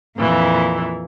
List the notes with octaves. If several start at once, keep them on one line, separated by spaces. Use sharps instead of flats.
F2 A#2 E3